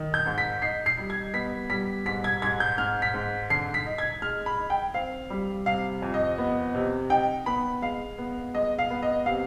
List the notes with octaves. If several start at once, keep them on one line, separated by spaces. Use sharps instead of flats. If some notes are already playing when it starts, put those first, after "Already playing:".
Already playing: D#3
G6
G#2
B6
D#4 C7
C7
G3
G#6
B3 B6
G3 B6
G#2 B6
G#6
G#2 G#6
G6
G#2 F6
B6
G#2
D3 C7
B6
D#4
G#6
G#3 F6
B5
D#4
G5
C4 F5
G3
C3 F5
F2
D#5
B3
C3
D#4 G5
B3 B5
G#3 F5
B3
G#3 D#5
F5
B3
D#5
C3 F5